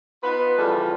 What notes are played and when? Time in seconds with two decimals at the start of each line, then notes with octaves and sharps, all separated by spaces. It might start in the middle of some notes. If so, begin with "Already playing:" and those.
0.23 B3 D#4 F4 B4
0.58 C#3 E3 F3 G3 F4 A4